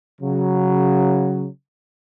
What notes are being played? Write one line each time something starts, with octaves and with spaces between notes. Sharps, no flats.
C#3 F#3